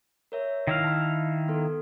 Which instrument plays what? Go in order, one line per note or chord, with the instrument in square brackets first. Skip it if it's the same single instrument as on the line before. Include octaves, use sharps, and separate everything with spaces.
[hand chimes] A#4 C#5 E5
[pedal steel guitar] D#3 E4 F5 [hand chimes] E5
[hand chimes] A5 B5
B3 A4